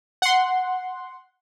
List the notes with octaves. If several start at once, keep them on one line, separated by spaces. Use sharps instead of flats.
F#5 C6